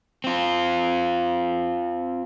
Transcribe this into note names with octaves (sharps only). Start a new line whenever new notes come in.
C4 F4